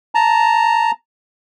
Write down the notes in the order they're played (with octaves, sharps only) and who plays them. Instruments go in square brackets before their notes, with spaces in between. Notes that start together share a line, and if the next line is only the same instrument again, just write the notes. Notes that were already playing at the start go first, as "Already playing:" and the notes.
[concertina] A5 A#5